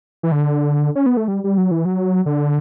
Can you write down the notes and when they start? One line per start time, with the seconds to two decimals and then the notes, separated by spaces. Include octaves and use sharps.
0.23 E3
0.32 D3
0.96 C#4
1.06 B3
1.17 A3
1.28 G3
1.44 G3
1.58 F#3
1.71 E3
1.85 F#3
2.26 D3